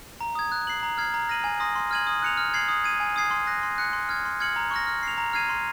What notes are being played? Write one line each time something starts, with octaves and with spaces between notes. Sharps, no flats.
A#5
D#6 G#6
F#6
C7 F#7
A#5
F6 G#6 C7
A#5
F6 A#6 D#7 F#7
G#5
C6 D#6 A#6
C6
F6 G#6 D#7 F#7
D#6
F#6 C#7 F7
F6
G#6 C7 F#7
D#6
G#6 D#7
G#5
D#6 G#6 C7
C6
F#6 A#6
C6
F#6 C#7
C6
F6 G#6
C6
F6 G#6 C#7 F#7
A#5
C#6 F6 A#6
F6
C7 F7
A#5
F6 G#6 C7 D#7
C6